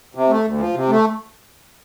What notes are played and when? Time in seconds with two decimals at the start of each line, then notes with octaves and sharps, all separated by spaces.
0.15 C3
0.29 A3
0.44 D2
0.58 F3
0.74 C3
0.89 A3